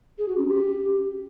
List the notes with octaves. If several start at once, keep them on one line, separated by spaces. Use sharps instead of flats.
G#4
F#4
C#4
G4